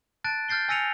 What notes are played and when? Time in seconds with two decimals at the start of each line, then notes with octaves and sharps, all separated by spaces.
0.24 A5 F#6 A6 D7
0.49 F6 G6 A6 C7 G7
0.69 G#5 E6 A#6 C#7 D#7 F7